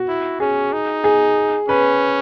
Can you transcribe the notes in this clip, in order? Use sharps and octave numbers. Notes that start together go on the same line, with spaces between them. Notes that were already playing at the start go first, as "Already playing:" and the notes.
Already playing: F#4
E4
C#4 G#4
D#4
G#4
C#4 B4